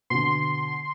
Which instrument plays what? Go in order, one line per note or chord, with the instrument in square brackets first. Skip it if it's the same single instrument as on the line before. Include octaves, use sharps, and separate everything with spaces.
[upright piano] B2 D3 [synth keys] C6